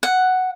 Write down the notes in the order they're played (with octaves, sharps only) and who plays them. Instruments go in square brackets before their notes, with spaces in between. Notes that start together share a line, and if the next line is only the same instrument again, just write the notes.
[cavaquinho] F#5